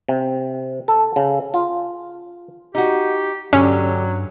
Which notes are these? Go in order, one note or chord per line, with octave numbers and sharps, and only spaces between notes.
C3
A4
C#3
F4
D#4 F#4 G4
G2 D3 F#3 C#4 G4